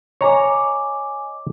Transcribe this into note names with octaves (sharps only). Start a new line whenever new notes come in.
C#5 D#5 G#5 A#5 D6